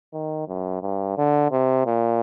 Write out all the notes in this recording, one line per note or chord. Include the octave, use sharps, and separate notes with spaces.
D#3
F#2
G2
D3
C3
A#2